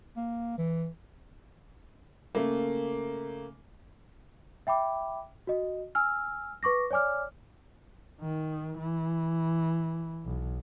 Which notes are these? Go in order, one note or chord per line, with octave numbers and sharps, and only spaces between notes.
A#3
E3
C#3 A3 A#3
E5 G5 B5 D6
F#4 D#5
G#5 E6 F6
B4 C#6 D6 A#6
C#5 D5 G#5 D6 F6
D#3
E3
B1